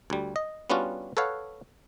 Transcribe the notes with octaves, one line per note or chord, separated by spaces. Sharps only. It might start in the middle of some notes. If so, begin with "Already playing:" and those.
D2 G3
D#5
G3 B3 C#4 D4 F4 F#4
A4 B4 C#5 F5 F#5